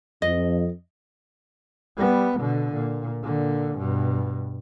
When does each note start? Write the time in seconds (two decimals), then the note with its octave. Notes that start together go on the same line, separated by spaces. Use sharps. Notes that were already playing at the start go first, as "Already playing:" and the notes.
0.22 F2 D#5
1.97 G3 B3
2.39 B2 D3
2.74 A#2
3.23 A#2 D3
3.78 G2 B2